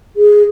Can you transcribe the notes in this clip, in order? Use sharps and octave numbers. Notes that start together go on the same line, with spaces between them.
G#4